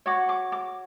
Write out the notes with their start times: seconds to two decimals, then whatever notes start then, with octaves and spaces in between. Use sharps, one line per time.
0.06 F#4 C#5 D6
0.29 D6
0.52 D6